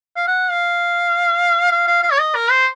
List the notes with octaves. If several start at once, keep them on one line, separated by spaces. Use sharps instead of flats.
F5
F#5
F5
F5
F5
F5
C#5
D#5
A#4
C5